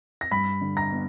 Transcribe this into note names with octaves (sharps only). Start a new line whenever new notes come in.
A#6
G2 B5 B6
D3
A#5 A#6
B3